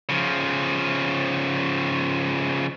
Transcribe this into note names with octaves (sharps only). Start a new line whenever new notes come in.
C#3 F3